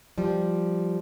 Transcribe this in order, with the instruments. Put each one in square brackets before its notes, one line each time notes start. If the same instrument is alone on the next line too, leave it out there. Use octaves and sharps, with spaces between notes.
[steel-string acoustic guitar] F3 G3